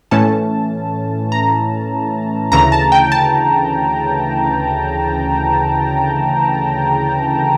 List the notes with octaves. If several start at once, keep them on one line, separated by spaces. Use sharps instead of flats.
A2 E3 A3 C#4 A5
A#5
D2 C#3 E3 A#5
A5
G5
A5